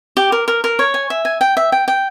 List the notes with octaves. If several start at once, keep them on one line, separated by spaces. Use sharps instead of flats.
G4
A#4
A#4
A#4
C#5
G#5
E5
G#5
G5
E5
G5
G5